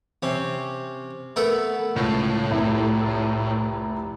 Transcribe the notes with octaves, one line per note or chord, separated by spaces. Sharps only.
C3 C4 C#4
A3 B3 A#4 E5 F#5
C#2 A2
F1 C2 E4